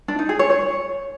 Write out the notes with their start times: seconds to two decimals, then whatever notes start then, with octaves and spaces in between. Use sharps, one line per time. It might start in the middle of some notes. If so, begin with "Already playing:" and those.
0.08 D4
0.19 D#4
0.29 G#4
0.39 C#5
0.50 C#5